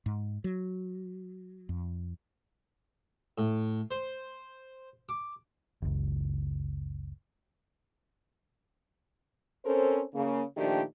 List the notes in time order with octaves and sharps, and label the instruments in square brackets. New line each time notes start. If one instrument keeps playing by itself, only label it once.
[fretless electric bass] G#2
F#3
F2
[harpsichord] A2
C5
D6
[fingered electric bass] F#1 C#2
[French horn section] C4 C#4 A4 A#4 C5
C#3 A#3
A#2 D#3 F3 A3 D4 G4